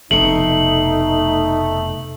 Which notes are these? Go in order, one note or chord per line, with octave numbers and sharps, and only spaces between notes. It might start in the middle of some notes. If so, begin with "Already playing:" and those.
F1 B2 A3 D#4 F#7